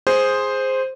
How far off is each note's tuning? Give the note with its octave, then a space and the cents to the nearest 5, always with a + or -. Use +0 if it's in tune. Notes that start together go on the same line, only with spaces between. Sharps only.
G#4 -5 C5 +0